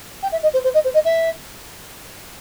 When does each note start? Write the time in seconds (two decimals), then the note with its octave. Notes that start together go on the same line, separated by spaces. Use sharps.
0.22 G5
0.31 E5
0.42 D#5
0.53 C5
0.63 C5
0.73 D#5
0.84 C5
0.93 D#5
1.04 E5